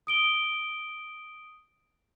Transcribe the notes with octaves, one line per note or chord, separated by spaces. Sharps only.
D#6 D7 G7